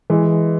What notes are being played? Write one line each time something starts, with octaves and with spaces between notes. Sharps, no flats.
E3 G#3